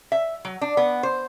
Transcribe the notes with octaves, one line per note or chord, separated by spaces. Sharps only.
E5
F#3
D4
B3
C5